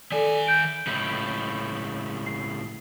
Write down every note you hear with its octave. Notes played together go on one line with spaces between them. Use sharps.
D#3 A4 D5 G#5
G6 D7
C#2 A2
C7